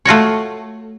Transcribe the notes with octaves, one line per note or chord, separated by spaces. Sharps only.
A3 F4 F#4 C#5